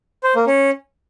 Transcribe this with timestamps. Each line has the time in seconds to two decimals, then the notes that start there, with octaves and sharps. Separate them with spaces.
0.23 C5
0.35 A#3
0.47 C#4